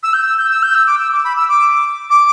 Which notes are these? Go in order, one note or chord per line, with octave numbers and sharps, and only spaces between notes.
E6
G6
E6
G6
E6
G6
E6
D6
E6
D6
B5
E6
D6
D6